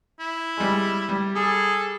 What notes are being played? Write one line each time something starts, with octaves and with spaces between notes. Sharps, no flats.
E4
G3 G#3
G3
G#4 A4